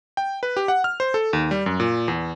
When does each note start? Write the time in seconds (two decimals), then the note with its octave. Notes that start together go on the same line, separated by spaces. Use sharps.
0.17 G5
0.43 B4
0.57 G4
0.68 F#5
0.84 F6
1.00 C5
1.14 A4
1.33 D#2
1.51 G3
1.66 F#2
1.80 A#2
2.08 E2